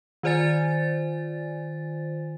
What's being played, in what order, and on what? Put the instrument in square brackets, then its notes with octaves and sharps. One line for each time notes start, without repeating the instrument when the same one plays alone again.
[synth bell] D#3 F4 C5 D5 G#5 A6